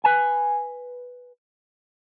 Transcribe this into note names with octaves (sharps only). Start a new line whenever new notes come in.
B4 G#5